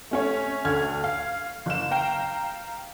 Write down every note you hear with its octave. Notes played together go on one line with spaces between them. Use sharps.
A3 C#4 C#5
D2 D3 F6 G#6
F5
F#1 E7
F5 G5 A#5